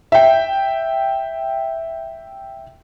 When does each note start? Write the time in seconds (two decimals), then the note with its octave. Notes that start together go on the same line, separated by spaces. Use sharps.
0.12 E5 G5